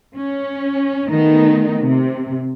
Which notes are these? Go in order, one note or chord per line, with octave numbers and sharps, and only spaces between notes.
C#4
D#3 A3 B3 D#4
C3